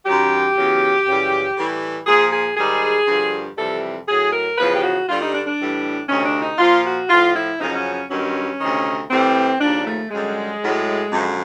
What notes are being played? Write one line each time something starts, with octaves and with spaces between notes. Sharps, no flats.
F#2 D#3 F#3 G4
E2 C#3 F#3
F#2 C#3 E3 G3
A2 E3 G3
A#2 F3 G#4
G#4
G#2 D#3 G3 G#4
G2 D3 F3
F2 C3 E3 G3 A4
A2 F#3 G#4
A#4
E2 C#3 F3 B4
G4
F#4
G2 D3 G3 F4
D#4
D4
D4
A2 E3 G3
D2 C3 D#3 C#4
D4
D#4
A#2 F3 F4
F#4
A2 F3 F4
E4
F#2 C#3 F3 D#4
C#4
C#4
G2 D#3 F#3 C#4
D2 C3 D#3
A2 E3 G3 C4
D#2 C#3 F3 D4
A3
F#2 D3 G3 G#3
A2 F#3
F#2 D3 F3